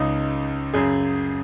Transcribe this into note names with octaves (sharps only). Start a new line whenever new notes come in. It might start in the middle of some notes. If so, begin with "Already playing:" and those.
Already playing: C#2 C#3 D#4
F#2 C#3 G#4